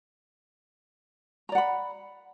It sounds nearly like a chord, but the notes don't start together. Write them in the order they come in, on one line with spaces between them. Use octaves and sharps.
A#5 D5 F#5 B5